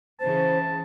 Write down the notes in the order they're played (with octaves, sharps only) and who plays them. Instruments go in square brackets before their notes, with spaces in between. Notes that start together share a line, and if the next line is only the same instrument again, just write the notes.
[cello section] C#3 E3 [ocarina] C5 [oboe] A5